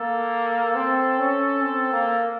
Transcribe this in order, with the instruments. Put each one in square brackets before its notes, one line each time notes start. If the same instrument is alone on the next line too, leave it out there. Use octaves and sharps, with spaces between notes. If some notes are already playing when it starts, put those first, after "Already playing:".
Already playing: [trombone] A#3 [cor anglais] A4
[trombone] C4
C#4
C4
A#3